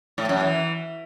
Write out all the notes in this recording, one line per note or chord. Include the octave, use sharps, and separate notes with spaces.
A2
F#2
E3